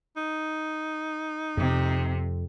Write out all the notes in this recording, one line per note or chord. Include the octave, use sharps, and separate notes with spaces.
D#4
F2 C3